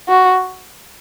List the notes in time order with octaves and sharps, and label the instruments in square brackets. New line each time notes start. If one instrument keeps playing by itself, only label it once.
[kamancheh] F#4